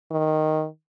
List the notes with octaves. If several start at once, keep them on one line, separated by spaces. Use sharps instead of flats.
D#3